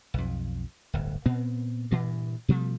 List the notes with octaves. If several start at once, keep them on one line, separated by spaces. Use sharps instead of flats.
B1 F2
D1 G1
A#2 B3 C4
G2 A#2 E3
B2 F3 G3 A3